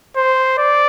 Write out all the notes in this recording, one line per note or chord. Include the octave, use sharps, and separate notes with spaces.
C5
D5